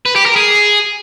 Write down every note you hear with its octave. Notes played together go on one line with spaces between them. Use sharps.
B4
G4
A#4
G#4